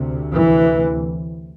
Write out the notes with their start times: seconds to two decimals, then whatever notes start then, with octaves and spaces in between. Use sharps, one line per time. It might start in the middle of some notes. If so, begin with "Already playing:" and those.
Already playing: D2 C3
0.33 E3